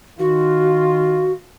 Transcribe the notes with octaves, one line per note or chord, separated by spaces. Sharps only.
D#3 F4 F#4